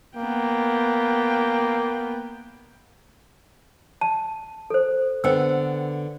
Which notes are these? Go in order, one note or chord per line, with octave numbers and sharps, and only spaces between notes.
A#3 B3 G5
A5
A4 C5
D3 B3 C5 G5 E6